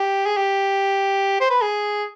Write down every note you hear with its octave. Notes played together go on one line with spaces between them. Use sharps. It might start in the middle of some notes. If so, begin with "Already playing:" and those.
Already playing: G4
G#4
G4
C5
B4
G#4